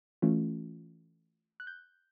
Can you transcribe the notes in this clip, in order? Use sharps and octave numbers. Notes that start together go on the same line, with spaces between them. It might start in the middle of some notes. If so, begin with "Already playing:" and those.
E3 A3 C#4 F4
F#6
G6